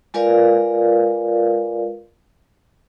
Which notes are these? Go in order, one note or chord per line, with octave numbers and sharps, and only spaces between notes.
G#3 F4 A#4 B4 D5 F5